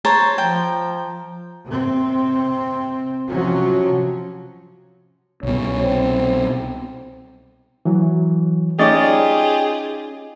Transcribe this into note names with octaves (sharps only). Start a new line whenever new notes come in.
C5 C#5 A5 A#5
F3 G5
C3 C4
C3 F3 F#3 C#4
C2 B2 C#4
C4
E3 F#3
C#4 D#4 F4 G4 G#4 D5 D#5 A6